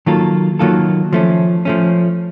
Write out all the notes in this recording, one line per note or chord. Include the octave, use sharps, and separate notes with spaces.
D#3 F#3 A#3 F4 A4
D#3 F#3 A#3 F4 A4
F3 A3 C#4
F3 A3 C#4